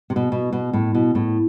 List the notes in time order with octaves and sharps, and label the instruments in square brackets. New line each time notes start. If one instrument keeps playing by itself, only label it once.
[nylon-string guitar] C3
B2
B2
B2
A2
B2
A2